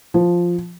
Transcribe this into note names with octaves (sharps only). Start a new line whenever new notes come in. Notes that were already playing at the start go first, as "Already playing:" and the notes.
F3